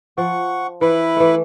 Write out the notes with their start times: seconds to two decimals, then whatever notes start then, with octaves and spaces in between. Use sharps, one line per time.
0.18 F3 F#5 C#6
0.81 E3 E4 B4
1.17 E3 A3